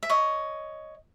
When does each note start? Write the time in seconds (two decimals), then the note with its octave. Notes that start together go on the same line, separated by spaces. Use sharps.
0.03 E5
0.10 C#5 D#5